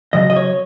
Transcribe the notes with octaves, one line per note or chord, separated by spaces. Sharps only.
C#3 F#3 D#5
D#5
C#5